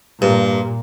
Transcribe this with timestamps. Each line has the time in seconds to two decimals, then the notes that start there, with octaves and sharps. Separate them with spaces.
0.22 G2 A#2